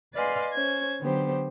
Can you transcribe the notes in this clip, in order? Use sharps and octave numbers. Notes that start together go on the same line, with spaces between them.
B4 D5 D#5 F5 G#5 C6
C#4 C5 G#6
D3 F#3 B3 G4 C5